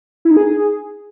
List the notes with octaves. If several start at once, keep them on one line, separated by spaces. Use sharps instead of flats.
E4
D#4
G#4